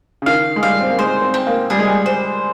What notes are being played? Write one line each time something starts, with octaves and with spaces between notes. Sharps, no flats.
C#3
D#3 F5
G#3
G3 F5
C4
A#3
G#3 C5
C4
C4
A#3
G3 G#4
G#3
G3
C5